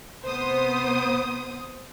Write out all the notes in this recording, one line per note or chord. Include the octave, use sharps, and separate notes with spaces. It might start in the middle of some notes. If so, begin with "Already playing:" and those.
C3 B3 C5 D#6